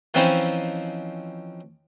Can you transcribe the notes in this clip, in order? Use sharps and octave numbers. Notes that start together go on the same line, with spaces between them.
E3 F3 C4 C#4 D#4 E4